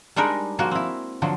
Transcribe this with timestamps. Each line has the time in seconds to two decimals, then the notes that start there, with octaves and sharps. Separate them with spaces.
0.16 G3 G#3 D4 D#4 A#4
0.59 F3 G#3 A#3 F#4
0.71 C4 E4
1.22 D3 F3 F#3